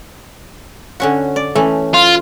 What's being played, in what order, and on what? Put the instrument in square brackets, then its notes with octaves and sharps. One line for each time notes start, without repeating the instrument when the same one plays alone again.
[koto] D3 C#4 F#4
D5
E3 A3 C#4
[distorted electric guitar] F4